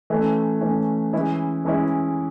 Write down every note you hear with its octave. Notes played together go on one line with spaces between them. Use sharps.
E3 A3 C#4
E3 A3 C#4
E3 G#3 C#4 E4
E3 G#3 C#4 E4